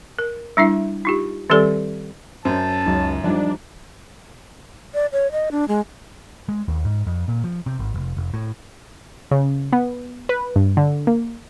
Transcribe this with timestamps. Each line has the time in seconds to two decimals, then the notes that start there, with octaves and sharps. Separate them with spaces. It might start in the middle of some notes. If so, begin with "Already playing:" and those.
0.19 A#4
0.57 G3 D4 E4 E5
1.05 D#4 F4 G4
1.50 D#3 G3 C4 G4 A4 D5
2.45 F#2 C#4 C5 A5
2.86 C#2 F#3 D#4
3.24 F3 G3 D4 D#4
4.94 D5
5.12 C#5
5.32 D#5
5.51 D4
5.68 G#3
6.49 G#3
6.68 D#2
6.85 G#2
7.07 F2
7.28 A#2
7.44 F3
7.66 C3
7.79 G#1
7.94 F1
8.17 F1
8.34 A2
9.31 C#3
9.73 B3
10.29 B4
10.56 G2
10.77 D3
11.07 A#3